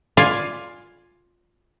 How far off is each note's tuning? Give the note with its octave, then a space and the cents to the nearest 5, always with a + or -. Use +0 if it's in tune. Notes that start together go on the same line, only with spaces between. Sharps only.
F4 +10 D5 +0 G#5 +0